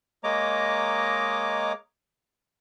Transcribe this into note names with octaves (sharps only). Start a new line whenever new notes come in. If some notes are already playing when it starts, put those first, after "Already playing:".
G#3 A#3 C#5 D#5 A#5 D6